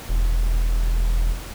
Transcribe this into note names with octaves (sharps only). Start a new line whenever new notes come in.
E1